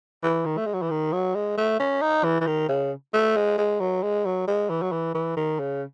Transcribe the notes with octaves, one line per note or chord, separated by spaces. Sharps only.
E3
D#3
A3
G#3
F#3
E3
D#3
F#3
G#3
A3
C#4
D#4
E3
E3
D#3
C#3
A3
G#3
G#3
F#3
G#3
F#3
G#3
E3
F#3
E3
E3
D#3
C#3